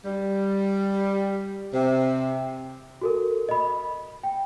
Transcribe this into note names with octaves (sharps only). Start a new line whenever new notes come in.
G3
C3
F#4 A4 A#4
D#5 B5
G5